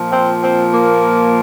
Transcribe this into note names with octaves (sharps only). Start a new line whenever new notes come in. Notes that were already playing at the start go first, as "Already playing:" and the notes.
Already playing: A#2 F3
C4
C4
A#3